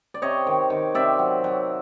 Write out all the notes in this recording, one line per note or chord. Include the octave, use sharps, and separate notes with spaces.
D5
C3 C#5 D#5
D#3
D#3
C3 D5 E5
F#3
F#3